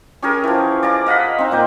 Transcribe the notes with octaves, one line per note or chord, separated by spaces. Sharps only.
C#4 G4 G#4 A#4
E3 F3
D5 F5 A#5
D#5 F5 F#5 B5
C4 D#4
A#2 A#3 G5